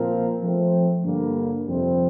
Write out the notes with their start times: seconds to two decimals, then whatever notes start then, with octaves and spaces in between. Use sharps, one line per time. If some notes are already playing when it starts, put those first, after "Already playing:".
Already playing: A#2 F3 C4 F4 A#4
0.41 F3 A3 C4
1.04 G2 D3 G3 A#3
1.66 F2 C3 G3 C4